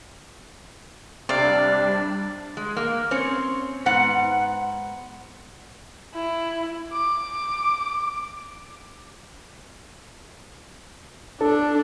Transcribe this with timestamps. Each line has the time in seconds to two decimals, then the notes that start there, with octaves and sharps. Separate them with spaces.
1.29 C3 G3 D4 D5 F5
2.57 G#3
2.77 A#3
3.11 C4 C#4 C5 C#5
3.86 G#2 B3 F#5
6.14 E4
6.92 D6
11.41 D4 A4